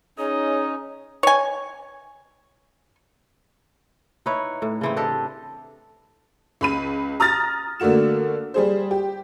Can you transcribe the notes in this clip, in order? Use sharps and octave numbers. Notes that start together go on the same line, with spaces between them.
C#4 D#4 G#4 C#5 D#5
C#5 G#5
D#4 E4 B4 C#5
A2
C#3 E3 C4
D4 G4 A4 D#5
C#2 B5 D#7
A#5 D#6 F6 A6 A#6
D3 A3 A#3 F#4 E7
G3 G#4 C5
G4